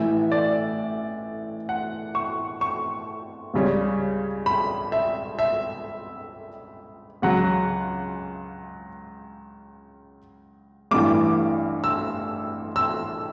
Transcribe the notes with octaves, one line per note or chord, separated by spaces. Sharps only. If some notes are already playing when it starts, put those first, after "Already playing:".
Already playing: A1 A2 E3 E5
D5
F#5
C#6
C#6
C#2 C#3 G3 C#4
B5
E5
E5
C#2 C#3 F#3 F#5
A1 G2 E3 D6
E6
E6